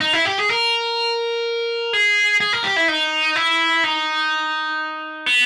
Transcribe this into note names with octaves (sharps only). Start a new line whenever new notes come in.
D#4
E4
G4
G#4
A#4
G#4
G#4
A#4
G4
E4
D#4
E4
D#4
B3